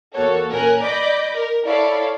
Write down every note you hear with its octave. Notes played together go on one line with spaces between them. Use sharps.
E2 A#3 F#4 A4 C#5
A#2 C#4 A#4 G#5 A#5 F#6
D5 D#5 B5 D6 G6 A#6
A#4
E4 A4 C#5 D5 F5